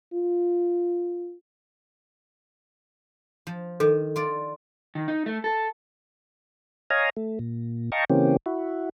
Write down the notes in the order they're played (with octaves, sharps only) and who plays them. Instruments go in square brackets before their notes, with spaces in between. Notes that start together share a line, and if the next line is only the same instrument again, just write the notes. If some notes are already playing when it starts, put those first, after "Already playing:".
[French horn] F4
[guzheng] F3
[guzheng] D#3 [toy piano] A4
[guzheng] F4 D5
[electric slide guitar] D#3
D#4
A3
A4
[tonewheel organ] C#5 D#5 F5 G#5 A#5
A3
A#2
D#5 F5 G5 A5 A#5 C#6
C#3 E3 A#3 C4 C#4 G4
E4 F#4